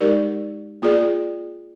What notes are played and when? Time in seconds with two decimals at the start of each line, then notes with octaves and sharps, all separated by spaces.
0.01 G#3 D#4 G4 A#4 D5
0.82 A#3 F4 G#4 D5